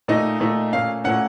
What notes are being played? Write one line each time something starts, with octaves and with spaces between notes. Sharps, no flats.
A#2 A3 D#4 D#5
A#2 A3 D#4
A#2 A3 C#4 F5
A#2 A3 C#4 F#5